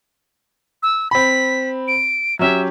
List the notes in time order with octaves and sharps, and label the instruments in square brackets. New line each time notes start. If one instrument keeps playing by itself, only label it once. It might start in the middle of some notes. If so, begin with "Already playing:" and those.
[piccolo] E6
[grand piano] C4 B5 [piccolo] B6
[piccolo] D7
[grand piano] F#3 C#4 G4 [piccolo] E5